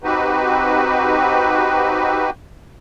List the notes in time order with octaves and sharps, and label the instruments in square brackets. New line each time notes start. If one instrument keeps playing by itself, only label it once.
[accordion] C4 D#4 F#4 G4 B4